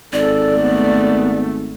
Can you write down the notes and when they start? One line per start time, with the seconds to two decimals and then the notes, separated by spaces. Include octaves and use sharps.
0.13 G#1 A4 D5
0.58 A3 B3